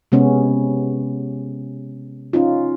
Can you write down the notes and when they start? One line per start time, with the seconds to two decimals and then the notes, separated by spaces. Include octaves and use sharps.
0.12 C3 G#3 B3 C#4
2.33 C#4 D#4 F4